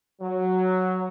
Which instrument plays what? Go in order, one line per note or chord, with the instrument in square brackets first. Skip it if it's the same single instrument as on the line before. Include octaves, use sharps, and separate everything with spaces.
[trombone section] F#3